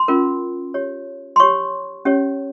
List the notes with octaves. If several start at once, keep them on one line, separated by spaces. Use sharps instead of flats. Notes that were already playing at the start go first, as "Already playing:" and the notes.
Already playing: C6
C#4 F4 A#4
G4 C#5
C6
G4 C#5 C#6
C#4 G4 C#5